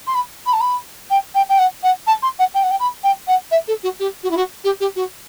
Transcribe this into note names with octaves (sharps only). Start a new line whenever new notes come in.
C6
B5
B5
A5
B5
G5
G5
G5
F#5
F#5
A5
C6
F#5
G5
F#5
G5
B5
G5
F#5
E5
A4
F#4
G4
F#4
E4
F#4
G4
G4
F#4